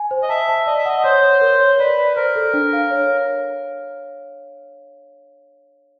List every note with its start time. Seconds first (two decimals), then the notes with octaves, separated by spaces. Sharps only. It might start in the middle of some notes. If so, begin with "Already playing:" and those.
Already playing: G#5
0.11 C5
0.22 D#5
0.29 E5 A5
0.49 A5
0.67 D5 D#5
0.78 E5
0.85 D#5 F#5
1.04 C5 C#5
1.23 C#5
1.41 A#4
1.60 C#5
1.79 B4 D5
1.98 D5
2.16 A#4 C5
2.36 A4
2.54 D4
2.73 F5
2.91 C#5